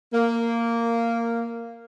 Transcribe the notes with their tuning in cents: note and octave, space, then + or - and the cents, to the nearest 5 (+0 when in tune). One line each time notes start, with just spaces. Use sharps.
A#3 -10